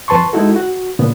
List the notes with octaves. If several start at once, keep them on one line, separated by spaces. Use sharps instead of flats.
F2 B4 A5 C6 C#6
G#3 D#4 E4 F#4 A4
F#4
A#2 C#3 B3